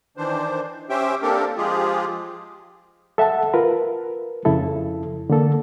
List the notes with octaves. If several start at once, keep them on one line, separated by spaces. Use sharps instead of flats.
D#3 E3 D4 C5
C#4 G4 C5 E5 G5
A#3 C4 D4 G4 A4 A#4
F3 G#3 F4 G4 G#4
A4 E5 F#5 A5
F4 A#4 B4
F2 C#3 E4 A4
D3 A#3 A4